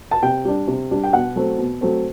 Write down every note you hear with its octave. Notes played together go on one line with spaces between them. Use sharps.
A5
C3 G5
G3 D4
C3
G3 D4
G5
B2 F#5
F#3 A3 C4
B2
F#3 A3 C4